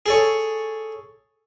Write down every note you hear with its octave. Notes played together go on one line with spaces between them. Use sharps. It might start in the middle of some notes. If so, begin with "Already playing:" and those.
G#4 A4 C#5